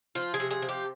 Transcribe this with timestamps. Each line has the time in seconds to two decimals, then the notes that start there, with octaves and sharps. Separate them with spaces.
0.15 F3 F4
0.34 G#4
0.40 C3
0.51 G#4
0.62 F3
0.69 G4